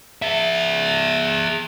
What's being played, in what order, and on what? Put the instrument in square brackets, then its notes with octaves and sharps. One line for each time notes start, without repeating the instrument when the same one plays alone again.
[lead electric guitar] G#4 E5